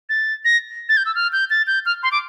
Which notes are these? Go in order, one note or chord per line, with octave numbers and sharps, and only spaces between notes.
A6
A#6
A6
G6
E6
F6
G6
A6
G6
F6
C6
D6